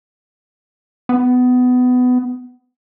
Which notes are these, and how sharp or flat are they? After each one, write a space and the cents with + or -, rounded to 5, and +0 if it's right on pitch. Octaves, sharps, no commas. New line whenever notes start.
B3 +20